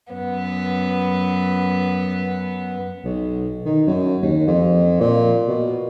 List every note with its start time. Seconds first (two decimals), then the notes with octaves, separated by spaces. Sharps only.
0.12 F#2 B3
3.04 B1
3.65 D#3
3.87 F#2
4.22 D#2
4.47 F2
5.00 A#2
5.48 B2